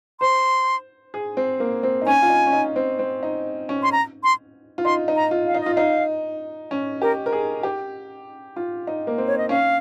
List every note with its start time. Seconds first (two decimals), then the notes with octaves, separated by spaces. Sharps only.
0.20 C5 C6
1.14 G#4
1.37 C4
1.60 A#3
1.83 C4
2.02 D#4
2.06 C#4 G#5
2.22 F4
2.29 D#4
2.46 C#4
2.53 D#4
2.76 C4
2.99 C4
3.23 D#4
3.69 C#4
3.83 C6
3.92 A#5
4.23 C6
4.78 F4
4.85 D#4 C6
5.08 D#4
5.16 A#5
5.31 F4
5.47 F5
5.55 D#4
5.61 D#5
5.66 F4
5.75 D#4 F5
6.71 C#4
7.02 G4 A#4
7.26 A#4
7.32 G#4
7.63 G4
8.56 F4
8.87 D#4
9.07 A#3
9.18 C4
9.27 C#5
9.38 D#5
9.49 C#4 F5